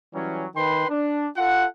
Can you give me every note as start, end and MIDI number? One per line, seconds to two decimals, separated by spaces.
0.14 0.46 52
0.14 0.46 54
0.14 0.46 55
0.14 0.46 61
0.56 0.85 51
0.56 0.85 71
0.56 0.85 79
0.56 0.85 83
0.56 0.85 84
0.89 1.28 62
1.37 1.66 65
1.37 1.66 69
1.37 1.66 78